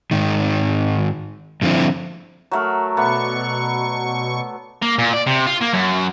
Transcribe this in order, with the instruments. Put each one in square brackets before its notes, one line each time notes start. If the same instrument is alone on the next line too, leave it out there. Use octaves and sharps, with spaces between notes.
[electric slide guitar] G#2 D#3
G2 D3 F3 C4 E4
[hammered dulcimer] F#3 A3 A#4
[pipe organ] B2 C#6 [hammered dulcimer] A3 B3 D5
[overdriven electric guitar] A#3
A#2
D5
C3
F4
A#3
F#2